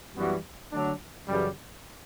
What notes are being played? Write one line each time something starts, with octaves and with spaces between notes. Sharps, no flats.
F#2 E3 G3 B3 F#4
D3 F#3 A3 D4
F#2 C#3 E3 G3